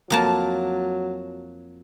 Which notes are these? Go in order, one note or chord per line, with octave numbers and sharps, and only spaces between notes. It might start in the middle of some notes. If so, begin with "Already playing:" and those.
F2 F#3 A#3 A5